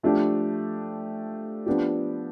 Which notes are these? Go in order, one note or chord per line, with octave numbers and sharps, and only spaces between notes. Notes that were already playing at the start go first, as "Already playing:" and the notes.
F3 A3 D4 G4
F3 B3 D4 G4